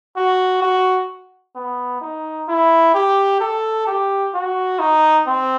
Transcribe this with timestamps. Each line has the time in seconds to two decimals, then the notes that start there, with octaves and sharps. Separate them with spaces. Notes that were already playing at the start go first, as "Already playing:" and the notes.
0.16 F#4
0.62 F#4
1.56 B3
2.01 D#4
2.48 E4
2.94 G4
3.40 A4
3.87 G4
4.34 F#4
4.79 D#4
5.26 C4